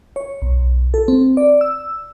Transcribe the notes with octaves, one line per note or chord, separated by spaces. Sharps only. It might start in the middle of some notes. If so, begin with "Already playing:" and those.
C#5
B1
A4
C4
D5
E6